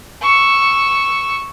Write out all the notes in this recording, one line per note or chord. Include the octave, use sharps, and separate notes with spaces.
C#6 E6